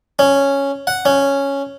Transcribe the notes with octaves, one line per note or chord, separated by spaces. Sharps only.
C#4
F#5
C#4